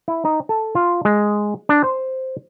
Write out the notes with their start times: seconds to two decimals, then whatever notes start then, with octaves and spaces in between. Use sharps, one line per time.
0.08 E4
0.25 D#4
0.49 A4
0.75 F4
1.05 G#3
1.69 D4
1.84 C5